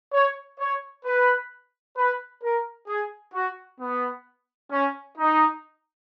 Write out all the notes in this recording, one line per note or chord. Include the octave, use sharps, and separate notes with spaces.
C#5
C#5
B4
B4
A#4
G#4
F#4
B3
C#4
D#4